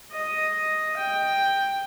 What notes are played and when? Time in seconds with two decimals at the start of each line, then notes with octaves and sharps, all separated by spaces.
0.12 D#5
0.97 G5